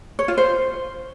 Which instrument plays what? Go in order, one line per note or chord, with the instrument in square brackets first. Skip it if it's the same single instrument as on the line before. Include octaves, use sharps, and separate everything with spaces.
[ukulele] C#5
F4
C5